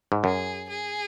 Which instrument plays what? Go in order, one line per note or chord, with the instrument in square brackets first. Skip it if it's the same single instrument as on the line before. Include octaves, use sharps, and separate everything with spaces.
[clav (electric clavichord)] G#2
[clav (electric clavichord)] F#2 [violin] G#4
[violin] G#4